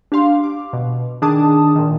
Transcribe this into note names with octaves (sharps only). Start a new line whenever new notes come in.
D4 G4 F5 C6
D6
B2
D#3 D4 G#4 A5 D#6
A#2 D#3